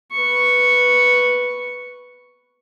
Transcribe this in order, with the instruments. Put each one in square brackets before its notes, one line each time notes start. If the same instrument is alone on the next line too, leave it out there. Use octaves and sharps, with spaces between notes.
[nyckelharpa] B4 C#6